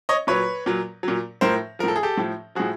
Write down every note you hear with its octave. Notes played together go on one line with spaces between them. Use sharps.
C#5 D#5
A#2 F#3 B4 C#5
A#2 F#3
A#2 F#3
A2 F3 A#4 C5
A2 F3 A4 A#4
G#4
G4 A4
A2 F3
A2 F3 F#4 G#4